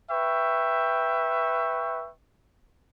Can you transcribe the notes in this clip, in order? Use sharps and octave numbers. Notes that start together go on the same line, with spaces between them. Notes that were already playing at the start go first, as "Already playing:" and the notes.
B4 E5 G5 C#6